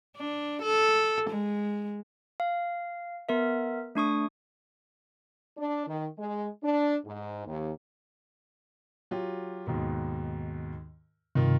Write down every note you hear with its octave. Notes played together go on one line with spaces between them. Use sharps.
D4
A4
G#3
F5
B3 A#4 E5
A3 D4 C#6 D#6
D4
D#3
G#3
D4
G#2
D#2
F#3 F4 G4
D#2 G#2 B2
G2 C3 D#3 F4